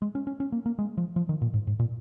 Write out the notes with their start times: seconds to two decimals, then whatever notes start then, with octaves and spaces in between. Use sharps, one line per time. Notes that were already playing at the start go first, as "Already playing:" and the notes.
0.02 G#3
0.15 C#4
0.27 C#4
0.40 C#4
0.52 A#3
0.66 A#3
0.79 G#3
0.97 F3
1.16 F3
1.29 D#3
1.42 A#2
1.54 G#2
1.67 G#2
1.79 A#2